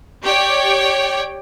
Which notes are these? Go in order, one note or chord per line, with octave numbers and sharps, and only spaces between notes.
G4 C#5 D5 G5